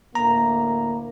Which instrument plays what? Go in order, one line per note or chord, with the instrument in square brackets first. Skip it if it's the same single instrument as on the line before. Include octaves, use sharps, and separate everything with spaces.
[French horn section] D2 A2 A#3 [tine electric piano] A#5